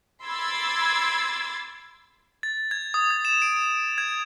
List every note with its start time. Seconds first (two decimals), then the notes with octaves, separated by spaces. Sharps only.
0.24 B5 C6 D6 E6 G#6 A6
2.43 A6
2.71 G#6
2.94 D#6
3.11 G#6
3.25 E7
3.42 D7
3.57 D7
3.98 G#6